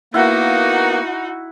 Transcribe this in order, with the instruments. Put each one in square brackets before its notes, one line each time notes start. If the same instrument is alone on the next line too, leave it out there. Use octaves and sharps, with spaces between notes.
[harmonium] A#3 B3 [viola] D#4 F#4 [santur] E4 F#5